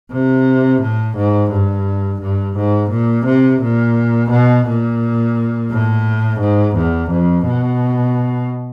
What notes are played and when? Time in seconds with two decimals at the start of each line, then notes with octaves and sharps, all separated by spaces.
0.12 C3
0.82 A2
1.17 G#2
1.51 G2
2.22 G2
2.57 G#2
2.91 A#2
3.26 C3
3.62 A#2
4.31 B2
4.67 A#2
5.71 A2
6.40 G#2
6.76 E2
7.11 F2
7.46 B2